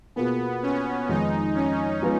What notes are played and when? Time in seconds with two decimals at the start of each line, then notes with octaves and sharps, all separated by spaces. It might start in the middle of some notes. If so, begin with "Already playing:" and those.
0.16 B2 A#3 B3 F4 G#4
0.63 C#4
1.09 F2 D#3 G#3 D#4
1.55 C#4
2.02 F3 G#3 B3 F4